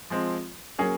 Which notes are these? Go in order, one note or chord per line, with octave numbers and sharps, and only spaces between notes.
F3 G#3 C4
F#3 A#3 C#4 G#4